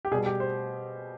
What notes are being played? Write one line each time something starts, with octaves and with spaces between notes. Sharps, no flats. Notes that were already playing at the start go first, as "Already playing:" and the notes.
G4
B2 G3 G#4
G4
C5